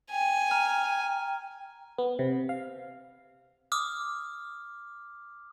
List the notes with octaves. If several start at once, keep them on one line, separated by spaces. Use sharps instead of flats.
G5 G#5
A#5 F6
B3
C3
F5
D6 D#6 F6